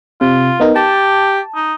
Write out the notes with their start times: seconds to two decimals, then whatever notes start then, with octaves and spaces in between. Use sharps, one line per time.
0.21 C3 F4
0.60 B3 D#4 A#4
0.76 G4 A5
1.55 D#4